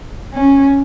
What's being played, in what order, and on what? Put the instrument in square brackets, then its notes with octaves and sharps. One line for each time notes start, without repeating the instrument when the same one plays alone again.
[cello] C#4